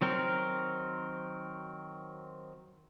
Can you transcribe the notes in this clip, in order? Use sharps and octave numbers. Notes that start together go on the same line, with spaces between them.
D#3 F#3 C4 A#4